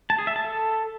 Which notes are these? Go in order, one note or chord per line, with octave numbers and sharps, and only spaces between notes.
A5
G#4
E5
A5
A4